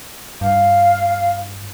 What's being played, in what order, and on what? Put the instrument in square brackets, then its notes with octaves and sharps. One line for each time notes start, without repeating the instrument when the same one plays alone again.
[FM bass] G2 [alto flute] F5